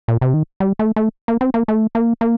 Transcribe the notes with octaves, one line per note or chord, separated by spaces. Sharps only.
A#2
C3
D#3
G3
A3
A3
A#3
C4
A#3
A3
A#3
A#3